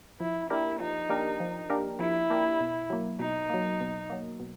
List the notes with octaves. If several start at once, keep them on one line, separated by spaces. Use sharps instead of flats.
F3 E4
A#3 D4 E4 G4 A#4
F3 D#4
A#3 D4 G4 A#4
F3
A#3 D4 G4 A#4
F3 E4
A#3 D4 G4 A#4
B2
F#3 A#3
B2 D#4
F#3 A#3
B2
F#3 A#3
B2